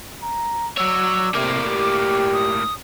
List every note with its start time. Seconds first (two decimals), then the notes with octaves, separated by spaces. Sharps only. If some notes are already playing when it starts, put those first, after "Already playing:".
0.23 A#5
0.78 F#3 C#5 D5 E6
1.34 A2 C3 A#3 D6
1.68 G4
2.33 D#6